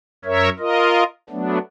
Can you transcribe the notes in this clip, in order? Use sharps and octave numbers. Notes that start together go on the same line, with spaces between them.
F#2 A#4 C#5 E5
F4 A#4 D#5
F#3 A3 B3 D4